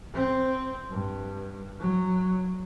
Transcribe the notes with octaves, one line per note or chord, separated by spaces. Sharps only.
C4
G2
F#3